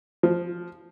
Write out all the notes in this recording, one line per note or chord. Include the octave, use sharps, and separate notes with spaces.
F3